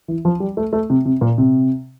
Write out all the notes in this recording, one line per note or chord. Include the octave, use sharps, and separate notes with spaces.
E3
F3
G3
A3
A3
C3
C3
A#2
C3